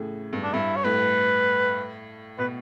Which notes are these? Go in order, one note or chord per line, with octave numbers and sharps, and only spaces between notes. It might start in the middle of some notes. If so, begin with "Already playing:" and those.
Already playing: A2 C#3 E3
G2
D4
G2 E4
C#5
A2 B4
B2 B4